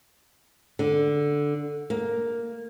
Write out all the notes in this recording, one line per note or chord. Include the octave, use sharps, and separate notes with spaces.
D3
A#3